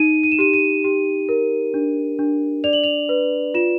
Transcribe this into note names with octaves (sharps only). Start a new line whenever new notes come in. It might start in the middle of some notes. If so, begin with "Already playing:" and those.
Already playing: D#4 D#7
D#7
E7
G4 D#7
D#7
G4
A#4
D4
D4
D5 F7
F#7
F7
B4
F4 E7